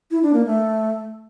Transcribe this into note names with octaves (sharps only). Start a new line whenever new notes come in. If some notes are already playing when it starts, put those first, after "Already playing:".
E4
D4
A#3
A3